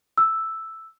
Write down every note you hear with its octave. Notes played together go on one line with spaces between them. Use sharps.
E6